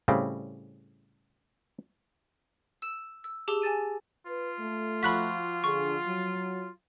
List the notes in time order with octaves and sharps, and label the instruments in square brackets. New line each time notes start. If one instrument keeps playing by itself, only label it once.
[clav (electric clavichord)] A2 C#3 G3 C4
[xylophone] E6 E7
E6
G4 G#4 A5 D6 E6 G7
G#5 A5 A6 D#7
[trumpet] F4 [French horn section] B4
[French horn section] A3
[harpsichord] F3 F#4 [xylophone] B5 F#6 B6
[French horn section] D3 D4 G#4 [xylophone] C#6
[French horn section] F#3